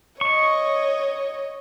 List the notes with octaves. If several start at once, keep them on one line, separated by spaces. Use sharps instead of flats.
C#5 D#5 C#6